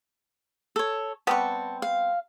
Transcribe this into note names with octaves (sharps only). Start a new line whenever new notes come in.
A4 C#5
G3 B3 C4 A5 C#6
F5